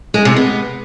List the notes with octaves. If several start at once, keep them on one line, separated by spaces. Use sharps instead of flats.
G#3
C3
B3